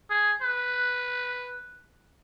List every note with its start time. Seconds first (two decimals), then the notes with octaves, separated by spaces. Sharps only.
0.10 G#4
0.42 B4